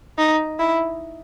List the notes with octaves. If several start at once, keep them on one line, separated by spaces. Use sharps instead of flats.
D#4
E4